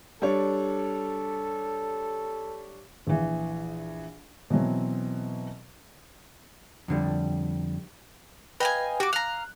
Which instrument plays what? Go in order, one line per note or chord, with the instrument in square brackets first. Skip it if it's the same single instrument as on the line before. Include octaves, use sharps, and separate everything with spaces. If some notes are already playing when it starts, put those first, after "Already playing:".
[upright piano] G3 D4 C#5 [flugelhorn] A4
[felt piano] A#1 E3
B2 E3 F#3 C4
[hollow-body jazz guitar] F2 D3 G3
[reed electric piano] B4 G5 [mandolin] D#5 F5 G#5
[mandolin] F#4 D6 [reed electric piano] G4
[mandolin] F5 A#5 [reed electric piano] F#6